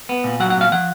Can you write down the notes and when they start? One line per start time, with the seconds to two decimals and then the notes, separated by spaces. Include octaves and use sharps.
0.09 B3
0.24 A#2
0.40 F#3 F#5
0.50 F#5
0.57 A#2 F5
0.72 F3 F#5